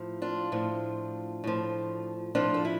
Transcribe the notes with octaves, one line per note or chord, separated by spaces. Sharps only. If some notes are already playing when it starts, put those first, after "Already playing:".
Already playing: A2 F3
D4 F4
A2 F3
A2 F3
A2 F3 D4 F4
A4
E4